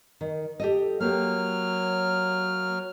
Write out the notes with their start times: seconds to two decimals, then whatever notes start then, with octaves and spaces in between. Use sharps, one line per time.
0.21 D#3
0.60 G4 A4 D#5
1.00 F#3 A#3 G4 F6